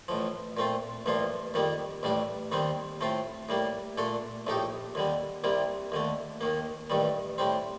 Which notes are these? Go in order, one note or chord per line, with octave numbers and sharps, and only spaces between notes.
A1 A2 F3
A#2 A3 C4 F4
A1 G2 F3 A#3 F4
F2 D#3 G3 A#3
A1 A2 G3 D4
D#2 D#3 G3 C4
A2 A3 C4 F4
A2 G3 A#3
A#2 A3 D4 A4
A#1 A2 A3 D#4 G4
D#2 D3 G3
C2 C3 G3 A#3
D#2 D3 A3
D#2 D#3 A#3
A1 G2 D#3 G3
A2 G3 C4